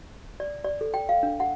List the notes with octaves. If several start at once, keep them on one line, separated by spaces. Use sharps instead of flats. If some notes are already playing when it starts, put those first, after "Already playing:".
D5
D5
A4
G5
F5
D4
F#5